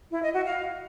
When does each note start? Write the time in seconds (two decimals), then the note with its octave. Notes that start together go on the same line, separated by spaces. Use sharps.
0.11 E4
0.23 D#5
0.34 F#4
0.45 F5